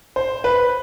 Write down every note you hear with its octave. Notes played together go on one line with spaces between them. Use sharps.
C5
B4